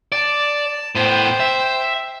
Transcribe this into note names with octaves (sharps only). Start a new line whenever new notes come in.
D5 A5
A2 B3 C5 G5
E5